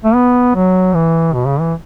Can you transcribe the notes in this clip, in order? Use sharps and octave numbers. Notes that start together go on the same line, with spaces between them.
A3
B3
F#3
E3
B2
C#3
E3